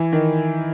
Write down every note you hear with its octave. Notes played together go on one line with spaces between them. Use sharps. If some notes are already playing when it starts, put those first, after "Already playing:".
Already playing: E3
D#3